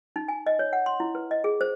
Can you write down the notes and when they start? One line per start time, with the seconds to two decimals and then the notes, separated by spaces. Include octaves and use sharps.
0.16 D#4
0.28 G#5
0.47 D#5
0.59 C#5
0.73 F#5
0.86 C6
1.00 E4
1.15 B4
1.31 D#5
1.44 G#4
1.61 C5